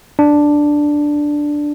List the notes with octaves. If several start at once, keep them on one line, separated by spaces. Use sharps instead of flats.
D4